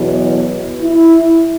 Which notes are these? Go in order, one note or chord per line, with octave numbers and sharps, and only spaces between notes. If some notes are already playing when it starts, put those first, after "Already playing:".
Already playing: E2 B2 F#3
E4